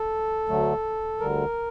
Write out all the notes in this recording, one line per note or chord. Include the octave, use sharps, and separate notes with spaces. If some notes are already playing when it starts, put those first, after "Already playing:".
Already playing: A4
D2 D3 F#3 A3
D2 D3 G3 A#4